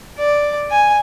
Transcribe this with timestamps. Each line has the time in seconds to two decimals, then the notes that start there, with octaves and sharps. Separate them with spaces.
0.18 D5
0.71 G#5